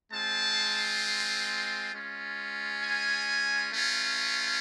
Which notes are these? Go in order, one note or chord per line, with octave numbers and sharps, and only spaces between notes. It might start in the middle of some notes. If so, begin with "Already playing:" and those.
G#3 C4 F4 A5
G#3 C#4 F4
G#5
A3 C#4 F4